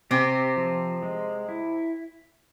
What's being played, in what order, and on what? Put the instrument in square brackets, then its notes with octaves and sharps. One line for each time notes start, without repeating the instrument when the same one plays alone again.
[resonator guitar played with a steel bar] C3 C4 [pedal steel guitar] G4
[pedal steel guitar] F3
G#3
E4